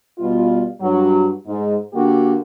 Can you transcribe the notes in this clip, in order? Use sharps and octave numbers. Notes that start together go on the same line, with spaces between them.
B2 G3 F4
G2 F#3
G#2
D3 A#3 F#4 G4